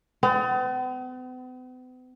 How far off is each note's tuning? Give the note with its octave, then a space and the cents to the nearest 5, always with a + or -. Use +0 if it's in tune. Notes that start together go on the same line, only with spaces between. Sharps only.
B3 +45